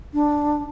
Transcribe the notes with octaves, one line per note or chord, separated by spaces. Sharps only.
D4